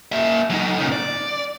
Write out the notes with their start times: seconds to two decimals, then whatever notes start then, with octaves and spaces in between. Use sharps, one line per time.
0.12 A#3 E5
0.51 F#3 D#4
0.80 A#2 C#3
0.92 D5